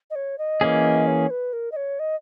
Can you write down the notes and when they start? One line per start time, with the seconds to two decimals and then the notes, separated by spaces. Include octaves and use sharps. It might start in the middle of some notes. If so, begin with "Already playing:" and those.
0.10 D#5
0.15 C#5
0.38 D#5
0.61 E3 A#3 C#4 G#4
1.07 C#5
1.30 B4
1.53 A#4
1.72 D#5
1.76 C#5
1.99 D#5